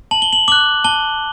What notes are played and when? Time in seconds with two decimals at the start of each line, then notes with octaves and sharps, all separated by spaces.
0.11 A5 F#7
0.22 G7
0.33 F#7
0.48 D6 F#6 F#7
0.84 A5 G7